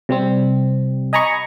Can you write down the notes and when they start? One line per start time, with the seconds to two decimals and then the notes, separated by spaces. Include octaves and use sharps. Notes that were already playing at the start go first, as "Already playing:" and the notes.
0.09 C3 G3 C4
1.13 D#5 G#5 A#5 B5 C#6